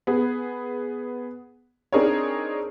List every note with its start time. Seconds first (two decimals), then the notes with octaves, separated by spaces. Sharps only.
0.07 B3 G#4
1.92 C4 D4 D#4 G#4 A#4 C#5